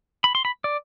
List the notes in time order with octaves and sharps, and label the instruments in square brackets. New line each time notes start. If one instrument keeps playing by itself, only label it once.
[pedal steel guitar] B5
C6
B5
D5